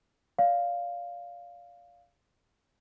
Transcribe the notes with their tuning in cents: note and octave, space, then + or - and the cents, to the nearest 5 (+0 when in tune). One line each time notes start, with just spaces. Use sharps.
D5 -25 F5 +0